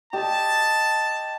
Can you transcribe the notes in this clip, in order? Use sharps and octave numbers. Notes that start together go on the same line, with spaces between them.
G4 D#5 A5